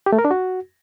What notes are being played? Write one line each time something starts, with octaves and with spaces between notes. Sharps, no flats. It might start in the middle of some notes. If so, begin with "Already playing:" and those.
G4
A3
A#4
D4
F#4